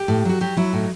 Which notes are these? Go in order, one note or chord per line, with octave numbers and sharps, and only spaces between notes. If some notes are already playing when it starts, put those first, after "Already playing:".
Already playing: G4
A2
F#3 F#4
F#3 G4
F#3 E4
A2 D#4